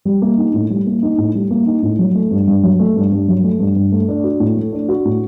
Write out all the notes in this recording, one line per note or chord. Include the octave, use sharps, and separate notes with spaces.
G3
A#3
D#4
A2
G3
A#3
D#4
A2
G3
A#3
D#4
A2
F#3
A3
G2
G2
F#3
A3
G2
G2
F#3
A3
G2
G2
A3
D4
F#4
A2
A3
D4
F#4
A2